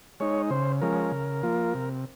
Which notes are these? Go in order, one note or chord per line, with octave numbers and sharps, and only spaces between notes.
G#3 D#4 C#5
C#3 C5
F3 G#3 C#4 A#4
C#3
F3 A#3 F4
C3